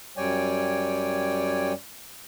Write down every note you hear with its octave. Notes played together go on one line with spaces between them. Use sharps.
F#2 G3 C#5 D5 G5 G#5